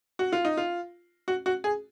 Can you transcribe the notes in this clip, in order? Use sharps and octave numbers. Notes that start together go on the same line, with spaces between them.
F#4
F4
D#4
F4
F#4
F#4
G#4